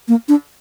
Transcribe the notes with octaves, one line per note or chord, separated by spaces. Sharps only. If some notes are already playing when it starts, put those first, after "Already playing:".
A#3
D4